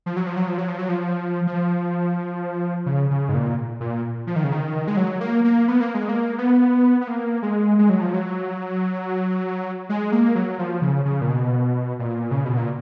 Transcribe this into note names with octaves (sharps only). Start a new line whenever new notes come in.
F3
F#3
F3
F#3
F3
F#3
F3
F#3
F3
F3
C#3
C#3
G#2
A#2
A#2
F3
D#3
C#3
D#3
G#3
F#3
A#3
A#3
B3
A#3
G#3
A#3
B3
B3
A#3
G#3
G#3
F#3
F3
F#3
G#3
A#3
F#3
F3
C#3
C#3
A#2
B2
A#2
C#3
B2
A#2